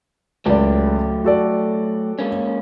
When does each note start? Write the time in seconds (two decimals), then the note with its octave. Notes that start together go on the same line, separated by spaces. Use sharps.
0.46 C#2 F#3 A3 G4 D5
1.24 F#4 A4 D5
2.19 G#3 A#3 C#4